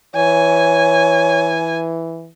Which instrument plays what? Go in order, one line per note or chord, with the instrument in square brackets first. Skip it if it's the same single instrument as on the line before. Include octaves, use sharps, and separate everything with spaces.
[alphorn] E3 [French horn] C#5 [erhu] G#5